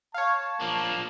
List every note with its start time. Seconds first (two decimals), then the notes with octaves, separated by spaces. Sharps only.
0.14 C#5 F5 A5
0.61 F3 A#3 D4